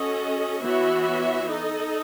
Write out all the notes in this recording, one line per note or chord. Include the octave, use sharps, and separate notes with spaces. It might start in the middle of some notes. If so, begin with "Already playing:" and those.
Already playing: C#4 F#4 A4 D#5
E3 B3 F#4 C#5 E5
D#4 A4 D#5